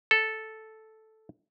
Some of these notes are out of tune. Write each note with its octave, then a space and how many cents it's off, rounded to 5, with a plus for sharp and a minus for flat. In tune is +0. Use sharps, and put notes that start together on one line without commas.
A4 -5